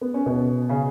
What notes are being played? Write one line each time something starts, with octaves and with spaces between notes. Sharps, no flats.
B3
C#4
B2 B3
C#3 C#4